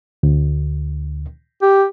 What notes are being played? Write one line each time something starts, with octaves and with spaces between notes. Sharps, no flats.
D2
G4